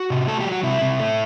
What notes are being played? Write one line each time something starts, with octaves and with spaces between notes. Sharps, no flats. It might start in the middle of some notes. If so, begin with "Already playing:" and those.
Already playing: F#4
C3
A3 A4
G4
F#3
F#4
C3 E4
C3
A3